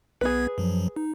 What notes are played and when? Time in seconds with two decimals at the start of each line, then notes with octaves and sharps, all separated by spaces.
0.21 B1 B3 G#4 B4 G#6
0.58 F#2 F3 F#3
0.96 D#4